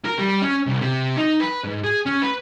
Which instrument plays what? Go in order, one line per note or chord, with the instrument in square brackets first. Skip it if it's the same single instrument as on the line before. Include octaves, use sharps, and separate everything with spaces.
[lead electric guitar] A#4
G3
C#4
C2
C3
D#4
B4
G#2
G#4
C#4
B4